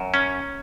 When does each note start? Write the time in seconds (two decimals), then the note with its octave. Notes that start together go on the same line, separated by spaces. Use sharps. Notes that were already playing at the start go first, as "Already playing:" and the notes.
Already playing: F#2
0.14 C#4